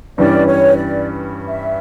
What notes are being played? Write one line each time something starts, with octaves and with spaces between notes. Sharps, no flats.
G2 E3 G3 C#4 D5
C#5
D5
E5